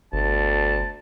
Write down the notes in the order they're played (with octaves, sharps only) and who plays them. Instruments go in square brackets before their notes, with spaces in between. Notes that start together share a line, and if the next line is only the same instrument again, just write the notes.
[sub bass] G1 [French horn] D2 [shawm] A5